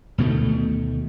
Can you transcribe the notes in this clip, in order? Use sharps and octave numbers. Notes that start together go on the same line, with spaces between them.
D2 B2 D#3 A3